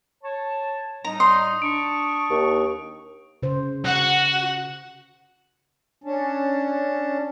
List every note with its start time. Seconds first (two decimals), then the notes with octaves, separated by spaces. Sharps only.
0.23 C#5 A5
1.05 A2 G3 D#4 A#5
1.20 C6 D#6
1.62 D4 C#6 D7
2.30 D#2
3.43 C#3 C5
3.85 F#4 F#5
6.04 C#4 D4